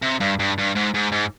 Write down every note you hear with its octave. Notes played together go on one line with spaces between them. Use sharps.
C3
G2
G2
G2
G#2
G#2
G#2